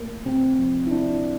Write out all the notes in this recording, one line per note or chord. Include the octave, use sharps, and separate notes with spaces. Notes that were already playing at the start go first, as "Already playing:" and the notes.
Already playing: A3 A#3
C3 C4
F3
E4
C3 D4